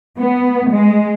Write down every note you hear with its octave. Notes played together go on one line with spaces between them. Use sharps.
B3
G#3